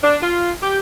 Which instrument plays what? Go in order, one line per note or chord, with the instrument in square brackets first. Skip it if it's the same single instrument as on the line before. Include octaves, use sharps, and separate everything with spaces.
[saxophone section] D4
F4
G4